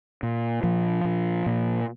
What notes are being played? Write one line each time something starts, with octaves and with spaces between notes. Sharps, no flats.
A#2
A#2 F3
A#2
A#2